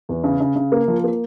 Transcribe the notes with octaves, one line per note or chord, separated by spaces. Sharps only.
E2
C#3
C#3
C#3
A#3
F3
A#3